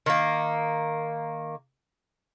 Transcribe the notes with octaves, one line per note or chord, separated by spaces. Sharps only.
D#3 A#3